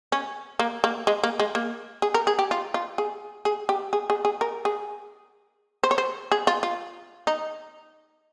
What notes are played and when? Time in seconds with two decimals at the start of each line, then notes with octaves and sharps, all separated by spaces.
0.12 C#4
0.59 A#3
0.84 A#3
1.07 G#3
1.23 A#3
1.40 G#3
1.55 A#3
2.02 G#4
2.14 A#4
2.27 G#4
2.39 G4
2.51 F4
2.74 F4
2.98 G#4
3.45 G#4
3.69 G4
3.93 G#4
4.10 G#4
4.25 G#4
4.41 A#4
4.65 G#4
5.84 C5
5.91 C#5
5.98 C5
6.32 G#4
6.47 F4
6.63 F4
7.27 D#4